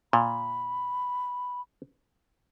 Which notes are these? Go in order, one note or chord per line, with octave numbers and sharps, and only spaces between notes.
A#2 B5